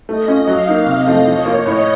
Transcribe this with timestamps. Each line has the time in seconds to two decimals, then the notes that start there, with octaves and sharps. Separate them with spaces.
0.09 A3 D#5
0.28 C#4 F4
0.47 F#3 F5
0.68 A#3 D#4
0.87 C3 D#5
1.06 F3 A3 C4
1.26 F3 C#5
1.45 A#3 F4
1.65 A2 D#5